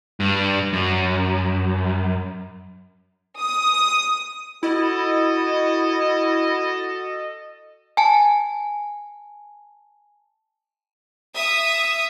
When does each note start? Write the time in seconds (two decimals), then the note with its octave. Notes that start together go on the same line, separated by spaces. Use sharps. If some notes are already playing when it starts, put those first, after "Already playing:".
0.20 G2
0.73 F#2
3.39 D#6
4.63 E4 F#4 A4 D#5
7.97 G#5 A5
11.35 E5 D#6